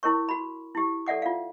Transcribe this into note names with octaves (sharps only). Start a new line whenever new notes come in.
E4 A#4 C#5 C#6
F#4 B5
E4 G4
A4 D5 E5 F#5 D6
F4 F5